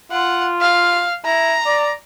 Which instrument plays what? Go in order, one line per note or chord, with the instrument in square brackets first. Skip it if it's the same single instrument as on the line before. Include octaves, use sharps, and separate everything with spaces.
[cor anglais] F4 [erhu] F#5
[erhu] F5
[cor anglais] E4 [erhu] A#5
[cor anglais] D5